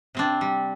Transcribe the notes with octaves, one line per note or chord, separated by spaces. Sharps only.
C3 C4 D4
G3